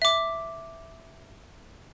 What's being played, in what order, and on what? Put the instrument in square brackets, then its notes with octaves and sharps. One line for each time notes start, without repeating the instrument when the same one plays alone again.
[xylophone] E5 D6